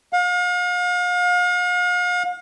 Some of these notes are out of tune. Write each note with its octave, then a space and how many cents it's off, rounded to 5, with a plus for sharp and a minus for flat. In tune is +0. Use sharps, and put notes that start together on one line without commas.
F5 +40